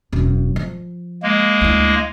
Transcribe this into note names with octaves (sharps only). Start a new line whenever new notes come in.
E1 F#2
F3
G#3 A#3
D2 E4